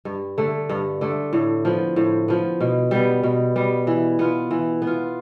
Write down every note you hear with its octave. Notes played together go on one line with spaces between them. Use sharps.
G2
D3 A3
G2
D3 A3
A2
F3 B3
A2
F3 B3
B2
G3 B3
B2
G3 B3
E3
B3 F4
E3
B3
F4